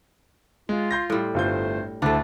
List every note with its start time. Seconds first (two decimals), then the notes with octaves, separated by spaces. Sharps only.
0.69 G#3 F4
0.91 C6 G6 A#6
1.10 A2 G3
1.34 G1 A3 F4 C5 G6
2.02 D2 A3 D4 E4 C5 A5